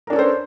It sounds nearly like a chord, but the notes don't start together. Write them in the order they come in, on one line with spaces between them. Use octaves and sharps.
A#4 D4 C#4 A4 C5